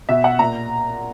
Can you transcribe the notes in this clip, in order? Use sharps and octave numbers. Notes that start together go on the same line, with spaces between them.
B2 E5
F#5
A#2 A#5